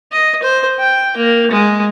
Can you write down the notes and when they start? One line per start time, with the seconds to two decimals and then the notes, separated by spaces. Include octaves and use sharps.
0.12 D#5
0.43 C5
0.79 G5
1.17 A#3
1.51 G#3